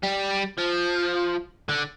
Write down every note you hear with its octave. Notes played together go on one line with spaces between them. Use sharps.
G3
F3
D3